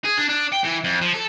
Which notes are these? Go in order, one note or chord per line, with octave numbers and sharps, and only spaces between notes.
G#4
D4
D4
G5
E3
F2
F3
A4